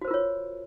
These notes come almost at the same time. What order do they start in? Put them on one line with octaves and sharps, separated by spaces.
F#4 C5 A#4 F4 C#5